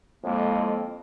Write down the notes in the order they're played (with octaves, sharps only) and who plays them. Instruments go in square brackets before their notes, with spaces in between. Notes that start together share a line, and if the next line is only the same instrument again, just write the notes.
[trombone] F2 [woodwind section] A2 G#3 A#3